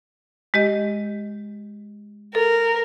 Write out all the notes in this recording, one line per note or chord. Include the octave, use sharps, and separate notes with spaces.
G#3 G4 D#5
A4 A#4